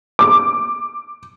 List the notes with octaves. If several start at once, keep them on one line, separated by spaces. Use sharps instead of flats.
D6